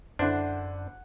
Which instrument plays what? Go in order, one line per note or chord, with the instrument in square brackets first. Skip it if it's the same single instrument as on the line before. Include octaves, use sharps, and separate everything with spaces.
[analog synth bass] F#2 [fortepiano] D3 E4 C5 [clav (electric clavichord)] D4 [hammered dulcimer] F#5